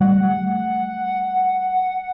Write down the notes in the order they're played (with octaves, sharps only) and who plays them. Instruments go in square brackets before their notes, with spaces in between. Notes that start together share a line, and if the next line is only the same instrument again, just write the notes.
[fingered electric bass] G3 A3 [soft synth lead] F#5